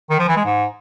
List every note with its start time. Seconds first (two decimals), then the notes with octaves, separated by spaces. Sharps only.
0.11 D#3
0.19 F3
0.28 E3
0.37 G#3
0.46 G#2